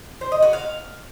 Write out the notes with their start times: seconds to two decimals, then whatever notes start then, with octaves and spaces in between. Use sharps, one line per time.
0.21 C5
0.32 D#5
0.42 F#4
0.53 F5